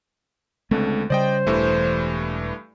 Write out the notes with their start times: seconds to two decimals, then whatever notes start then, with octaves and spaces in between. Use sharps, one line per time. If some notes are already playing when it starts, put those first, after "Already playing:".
0.71 C#2 D3 G#3 A3 C4
1.10 C#3 G3 C5 D5 D#5 G5
1.47 E1 G2 E3 A3